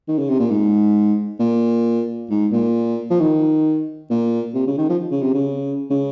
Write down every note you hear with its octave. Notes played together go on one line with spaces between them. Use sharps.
D#3
C#3
C3
A#2
G#2
A#2
G#2
A#2
F3
D#3
A#2
C3
C#3
D#3
F3
C#3
C3
C#3
C#3